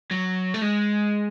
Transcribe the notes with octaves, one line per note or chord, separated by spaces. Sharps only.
F#3
A3
G#3